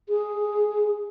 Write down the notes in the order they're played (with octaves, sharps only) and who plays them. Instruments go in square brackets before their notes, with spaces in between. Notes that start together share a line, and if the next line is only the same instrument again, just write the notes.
[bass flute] G#4